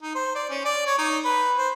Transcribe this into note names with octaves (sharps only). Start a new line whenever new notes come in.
D#4
C5
D5
C#4
D5
C#5
D#4
B4
C5